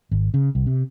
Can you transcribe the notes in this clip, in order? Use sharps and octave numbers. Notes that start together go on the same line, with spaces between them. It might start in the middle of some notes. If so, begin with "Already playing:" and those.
G#1
C#3
C2
C3